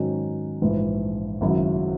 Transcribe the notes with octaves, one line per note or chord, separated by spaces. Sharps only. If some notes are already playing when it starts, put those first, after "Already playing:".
Already playing: G#2 D#3 F#3 C#4 D#4
A#1 G#2 E3
G#1 F#2 C#3 F#3 E4